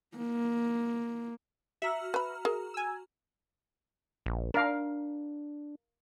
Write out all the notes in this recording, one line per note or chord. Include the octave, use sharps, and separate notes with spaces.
A#3
F#4 E5 A#5 F6
B4 B5
G#4 A#4
G#5 E6
A#1
D4 A#4 F5